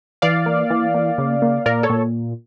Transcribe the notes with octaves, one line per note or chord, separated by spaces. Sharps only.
E3 D5 F5
A#3
E3
A#3
C#3
A#3
A#2 A#4 D5
A4 C#5
A#2